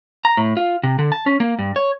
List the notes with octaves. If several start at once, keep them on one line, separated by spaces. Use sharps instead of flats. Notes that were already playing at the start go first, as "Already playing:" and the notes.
A#5
A2
F4
C3
D3
A5
C#4
A#3
G2
C#5